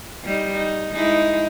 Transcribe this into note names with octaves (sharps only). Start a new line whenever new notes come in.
G3 D#4
D#4
G#3 D#4 E4